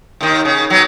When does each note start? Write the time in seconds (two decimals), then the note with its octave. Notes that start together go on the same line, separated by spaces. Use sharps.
0.21 D#2 D#3
0.45 C#3
0.70 F#3 B3